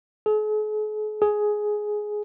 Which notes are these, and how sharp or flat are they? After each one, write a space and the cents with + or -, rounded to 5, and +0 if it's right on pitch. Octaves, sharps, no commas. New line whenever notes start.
G#4 +45
G#4 +10